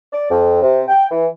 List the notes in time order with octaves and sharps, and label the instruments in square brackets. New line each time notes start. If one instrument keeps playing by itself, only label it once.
[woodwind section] D5
F2
C3
G5
E3